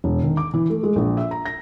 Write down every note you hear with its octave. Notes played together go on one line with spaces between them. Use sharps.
E1
D#3
D6
E3
A3
G#3
A#1
E5
A#5
A#6